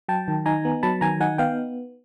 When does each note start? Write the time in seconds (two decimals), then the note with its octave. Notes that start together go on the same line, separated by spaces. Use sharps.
0.08 F#3 G5 A5
0.28 D#3
0.46 D#4 G#5 A#5
0.65 B3
0.83 F#3 A5 B5
1.01 D#3 G#5 A#5
1.20 D#4 F#5 G#5
1.38 B3 F5 G5